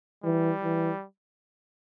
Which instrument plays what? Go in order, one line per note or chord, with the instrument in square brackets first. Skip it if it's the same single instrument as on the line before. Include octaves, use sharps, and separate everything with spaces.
[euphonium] E3 [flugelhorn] G3
[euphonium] E3